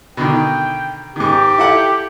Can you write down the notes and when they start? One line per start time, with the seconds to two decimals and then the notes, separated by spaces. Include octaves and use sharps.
0.17 B2 D3 D#3 G5
1.16 G#2 D#3 G4
1.58 E4 A4 F#5